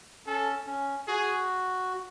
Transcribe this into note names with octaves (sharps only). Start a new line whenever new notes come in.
C#4 A4
C#4
F#4 G#4